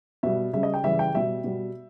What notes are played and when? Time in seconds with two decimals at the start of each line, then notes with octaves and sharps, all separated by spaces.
0.23 B2 G3 E5
0.53 C#3 G3 E5
0.63 D#5
0.74 G5
0.84 C#3 E3 G3 E5
0.99 G5
1.14 B2 G3 E5
1.44 B2 G3